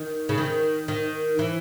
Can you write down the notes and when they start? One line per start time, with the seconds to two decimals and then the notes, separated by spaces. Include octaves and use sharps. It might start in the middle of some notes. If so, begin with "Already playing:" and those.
Already playing: D#3
0.29 C#3
0.38 D#3
0.88 D#3
1.39 E3